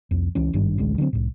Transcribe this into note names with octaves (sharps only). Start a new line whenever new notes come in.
C2 F2
C#2 E3 C#4
G#1 G2 D#3 G3
A1 D2 G#3
D3 F#3 A3 C4
C2 A2